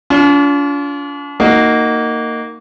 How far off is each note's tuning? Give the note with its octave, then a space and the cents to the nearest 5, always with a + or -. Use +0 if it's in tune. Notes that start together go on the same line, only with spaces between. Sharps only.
D4 -45 F4 +5
A#3 -15 D#4 +0 F#4 +0